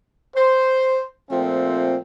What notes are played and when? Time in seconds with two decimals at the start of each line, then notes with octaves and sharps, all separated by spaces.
0.36 C5
1.30 A#2 F3 A3 C4